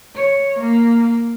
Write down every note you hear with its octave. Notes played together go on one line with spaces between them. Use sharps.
C#5
A#3